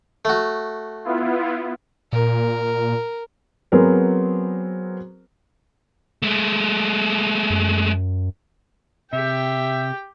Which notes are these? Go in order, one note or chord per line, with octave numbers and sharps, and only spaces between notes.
A3 F#4
B3 E4 F4
A#2 A#4
F#3 B3 C4 G#4 A#4 C5
G#3 A3
F#2
C3 G4 E5 G5